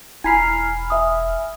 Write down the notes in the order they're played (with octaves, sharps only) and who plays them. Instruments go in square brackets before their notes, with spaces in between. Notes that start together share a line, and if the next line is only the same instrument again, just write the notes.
[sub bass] E1 [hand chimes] E4 A#5 C7 [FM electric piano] G#5 B5 F6
[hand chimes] E5 D#6